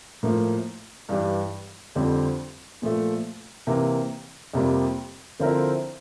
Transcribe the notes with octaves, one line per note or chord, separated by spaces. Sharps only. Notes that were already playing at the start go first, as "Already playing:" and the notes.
A2 F3 A#3 E4
G2 E3 G3
F2 D3 G3 C4
A#2 F3 A3
C3 E3 A#3
F2 C3 G3 A#3
D3 F3 C4 E4 A#4